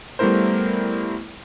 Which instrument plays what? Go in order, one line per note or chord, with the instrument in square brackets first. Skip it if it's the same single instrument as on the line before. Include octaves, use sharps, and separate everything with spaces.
[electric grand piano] G3 A3 B3 E4 A#4 C5